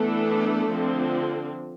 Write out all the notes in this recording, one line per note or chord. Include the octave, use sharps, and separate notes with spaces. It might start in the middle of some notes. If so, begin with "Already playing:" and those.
Already playing: E3 A3 B3 D4 A4
D3 F3 C4